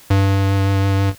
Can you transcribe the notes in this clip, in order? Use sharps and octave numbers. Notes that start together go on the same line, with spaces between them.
G2